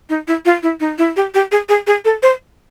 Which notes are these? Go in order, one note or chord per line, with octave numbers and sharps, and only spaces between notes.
D#4
E4
F4
E4
D#4
E4
G4
G4
G#4
G#4
G#4
A4
C5